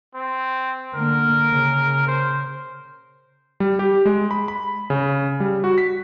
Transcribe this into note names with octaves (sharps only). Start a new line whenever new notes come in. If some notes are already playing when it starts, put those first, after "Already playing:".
C4
D3 A#3 A#4
C#3
C5
G3
G4
G#3
B5
B5
C#3
G3
F#4
B6